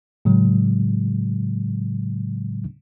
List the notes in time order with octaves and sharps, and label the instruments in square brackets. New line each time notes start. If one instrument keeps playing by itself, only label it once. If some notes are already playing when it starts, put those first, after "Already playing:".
[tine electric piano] A2 C#3 F#3 G#3